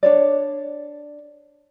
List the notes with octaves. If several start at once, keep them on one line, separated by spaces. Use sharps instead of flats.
D4 C#5 D5